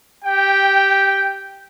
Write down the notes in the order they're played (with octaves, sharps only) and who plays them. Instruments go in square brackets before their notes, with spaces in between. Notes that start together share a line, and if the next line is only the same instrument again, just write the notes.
[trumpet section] G4 G5